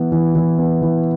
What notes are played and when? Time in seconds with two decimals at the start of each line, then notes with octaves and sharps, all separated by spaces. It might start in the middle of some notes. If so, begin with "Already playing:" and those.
Already playing: E3 B3
0.12 E3
0.35 E3
0.59 B3
0.82 E3